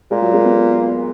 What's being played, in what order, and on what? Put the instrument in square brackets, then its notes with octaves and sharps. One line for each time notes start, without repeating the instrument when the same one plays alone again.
[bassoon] A#2 [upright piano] G#3
[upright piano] F#3
G#3
B3